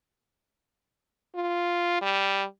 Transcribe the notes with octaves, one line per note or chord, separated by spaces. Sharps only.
F4
G3